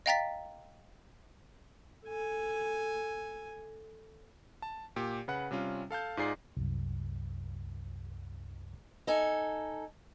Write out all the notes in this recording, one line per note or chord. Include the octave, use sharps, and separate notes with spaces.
D#5 F5 G5 A#5 A6 B6
A4 G#5
A5
A#2 G4
C#3 B4 F#5 F#6
C3 G3 C#4 F4
A4 F5 A5 G6
G#2 D#4 F4 G#4 D5 C7
C2 F#2
D#4 A4 G#5